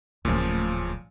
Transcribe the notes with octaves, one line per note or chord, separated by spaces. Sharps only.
D1 A#2 C#3 F3 A3